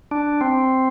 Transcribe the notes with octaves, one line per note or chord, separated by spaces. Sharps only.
D4
C4